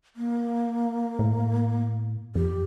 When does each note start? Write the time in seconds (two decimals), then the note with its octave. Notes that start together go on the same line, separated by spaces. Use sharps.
0.16 A#3
1.19 A2
2.35 F2 G4